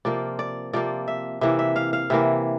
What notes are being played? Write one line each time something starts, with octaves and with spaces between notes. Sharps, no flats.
C3 F3 A#3 D5
D5
C3 F3 A#3 D5
E5
C3 E3 A#3 E5
E5
F5
F5
C3 E3 A#3 E5